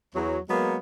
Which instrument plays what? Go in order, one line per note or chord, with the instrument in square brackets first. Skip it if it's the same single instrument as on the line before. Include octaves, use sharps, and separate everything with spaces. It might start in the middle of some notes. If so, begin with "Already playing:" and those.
[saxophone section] E2 F#3
F#3 G#3 A#3 B3